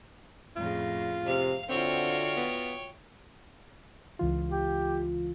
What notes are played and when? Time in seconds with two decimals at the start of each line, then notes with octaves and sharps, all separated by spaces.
0.56 F2 A2 C#3 F4
1.26 C3 F5
1.69 D3 C4 F4 F#4 C#5 E5 G5
2.37 B3
4.19 C#2 E3 F4
4.50 G4